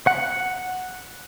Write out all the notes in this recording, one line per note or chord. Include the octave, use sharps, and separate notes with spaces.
F#5